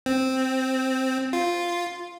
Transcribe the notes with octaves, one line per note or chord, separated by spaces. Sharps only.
C4
F4